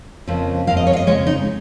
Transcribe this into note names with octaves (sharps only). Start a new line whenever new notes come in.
F2 C#3 F3 A#3
F2 C#3 A#3 F5
D#5
C#5
F5
D#5
F2 C#3 G#3 C#5
D#4